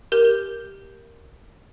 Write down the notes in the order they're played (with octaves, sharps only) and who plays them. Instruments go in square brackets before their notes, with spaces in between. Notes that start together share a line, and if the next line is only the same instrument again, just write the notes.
[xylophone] G4 A#4 G6